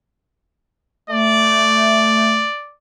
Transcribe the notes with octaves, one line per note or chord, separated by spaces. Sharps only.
A3 D5